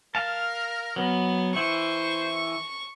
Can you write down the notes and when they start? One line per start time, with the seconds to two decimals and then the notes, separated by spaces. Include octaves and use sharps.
0.15 A#4 F5 A5
0.96 F#3 B3
1.55 E3 E4 C5 C#6